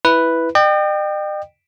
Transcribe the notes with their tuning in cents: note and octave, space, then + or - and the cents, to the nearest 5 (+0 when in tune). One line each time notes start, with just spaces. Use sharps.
E4 +0 B4 +0
D#5 -45 G5 +0